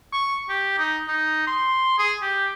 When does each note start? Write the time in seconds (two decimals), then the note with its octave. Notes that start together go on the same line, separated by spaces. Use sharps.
0.13 C#6
0.49 G4
0.78 D#4
1.08 D#4
1.47 C6
1.98 G#4
2.22 G4